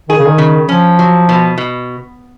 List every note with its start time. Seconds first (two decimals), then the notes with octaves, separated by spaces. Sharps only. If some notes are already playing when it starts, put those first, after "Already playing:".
0.09 D#3 G#4
0.18 C#3
0.28 D#3
0.38 C#3
0.69 F3 C#4
0.99 F#3
1.29 B2
1.58 B2